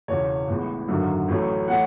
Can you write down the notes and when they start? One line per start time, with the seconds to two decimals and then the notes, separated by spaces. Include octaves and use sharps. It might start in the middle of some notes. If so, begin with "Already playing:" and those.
0.08 E1 E2 C#3 C#5
0.48 A1 A2 G#3 B3
0.88 G#1 F#2 D3 F#3
1.28 A1 A2 F#3 A3 C#4
1.68 E3 A3 C#4 F#5